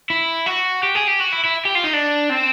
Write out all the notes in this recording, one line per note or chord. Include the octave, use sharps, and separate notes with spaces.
E4
F#4
G4
G#4
G4
F#4
E4
E4
G4
F4
D#4
D4
C4